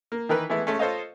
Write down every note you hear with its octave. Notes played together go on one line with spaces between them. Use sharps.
A#3
D#3 E3 A#4 B4
E3 G#3 A3 B3 E4
G#3 A3 C#4
F4 A4 C5 C#5 D#5 F5